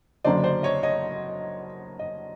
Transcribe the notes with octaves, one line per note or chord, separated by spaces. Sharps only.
F#1 F#2 D3 C5 D5
C5 D5
C#5 D#5
C#5 D#5
D#5